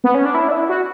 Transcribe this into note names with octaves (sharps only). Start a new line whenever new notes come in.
B3
C#4
D4
E4
D4
E4
F#4